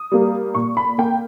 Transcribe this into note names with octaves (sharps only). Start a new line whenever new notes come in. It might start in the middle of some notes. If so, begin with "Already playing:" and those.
Already playing: D#6
G3 A#3
A#2 C#6
B5
A#3 G5